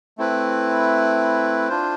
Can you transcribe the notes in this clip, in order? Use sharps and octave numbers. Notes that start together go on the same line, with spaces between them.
A3 C4 E4 B4
D4 F4 C5